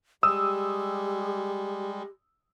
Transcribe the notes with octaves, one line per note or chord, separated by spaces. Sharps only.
G3 G#3 G4 D#6 E6